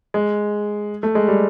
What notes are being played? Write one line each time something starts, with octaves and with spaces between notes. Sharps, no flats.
G#3
A3
G#3
G3